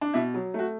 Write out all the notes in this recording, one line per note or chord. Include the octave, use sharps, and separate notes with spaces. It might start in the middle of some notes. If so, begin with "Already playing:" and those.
D4
B2 E4
F#3
A3 F#4